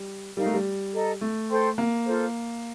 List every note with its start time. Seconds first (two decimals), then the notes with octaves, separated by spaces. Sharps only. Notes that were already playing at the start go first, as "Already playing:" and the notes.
Already playing: G3
0.37 G3 D#4 A#4 F5
0.46 A3
0.54 G3
0.93 A4 D#5 A#5
1.21 A3
1.49 A4 C5 G5 C6
1.78 A#3
2.06 F4 A4 C5